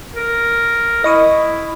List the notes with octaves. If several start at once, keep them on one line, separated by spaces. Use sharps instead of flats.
A#4
E4 D#5 C#6 D#6